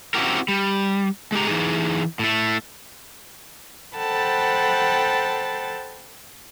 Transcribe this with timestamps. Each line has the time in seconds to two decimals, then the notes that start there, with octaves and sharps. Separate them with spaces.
0.14 C4 C#4 E4 F#4 G4 A#4
0.48 G3
1.32 G#3 A3 G4 A#5
1.47 E3 D#4 G#4
2.19 A2 A3
3.97 A4 C5 F#5 G5 A5 B5